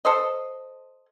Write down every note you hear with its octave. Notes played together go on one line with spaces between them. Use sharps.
A4 C5 D#5